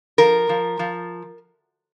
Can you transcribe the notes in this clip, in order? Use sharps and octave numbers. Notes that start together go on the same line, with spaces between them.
F3 A#4
F3
F3